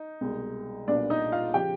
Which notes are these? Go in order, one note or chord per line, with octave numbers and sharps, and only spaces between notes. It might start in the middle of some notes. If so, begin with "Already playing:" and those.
Already playing: D#4
C2 B2 G#3
B1 A#2 G3 B3 D4 D5
D#4 D#5
F4 F5
C#3 F3 G4 G5